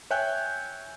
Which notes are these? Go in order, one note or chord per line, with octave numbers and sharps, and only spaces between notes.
C#5 E5 G5 G#5 F#6 G6